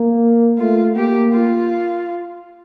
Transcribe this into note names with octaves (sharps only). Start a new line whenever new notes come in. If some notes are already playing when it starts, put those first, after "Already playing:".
Already playing: A#3
A3 F4
A#3 G4
F4